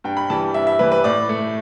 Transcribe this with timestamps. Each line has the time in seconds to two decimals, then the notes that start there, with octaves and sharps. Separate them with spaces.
0.04 G2 G5
0.17 B5
0.30 E3 G3 A5
0.54 G2 E5
0.67 E5
0.79 E3 G3 B4
0.92 B4
1.04 A2 D5
1.29 A3